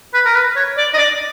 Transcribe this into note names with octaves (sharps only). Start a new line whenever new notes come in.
B4
A#4
B4
C#5
D5
D#5
D5